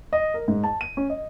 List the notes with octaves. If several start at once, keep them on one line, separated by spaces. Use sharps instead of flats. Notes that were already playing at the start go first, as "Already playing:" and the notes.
D#5
A#4
G#2
A5
D#7
C#4
D#5